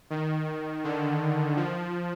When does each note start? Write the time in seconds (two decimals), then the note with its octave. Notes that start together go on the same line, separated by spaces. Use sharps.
0.10 D#3
0.84 D3
1.57 F3